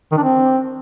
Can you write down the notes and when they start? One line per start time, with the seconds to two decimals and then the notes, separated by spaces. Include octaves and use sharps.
0.12 D#3
0.17 D4
0.23 C4